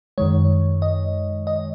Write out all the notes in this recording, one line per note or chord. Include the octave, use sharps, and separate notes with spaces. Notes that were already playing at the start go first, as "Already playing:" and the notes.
F#2 D#3 G#3 C#5
D#5
D#5